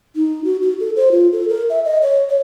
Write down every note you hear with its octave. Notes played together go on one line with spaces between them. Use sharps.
D#4
F#4
F#4
A4
C5
F4
A4
A#4
E5
D#5
C#5
C#5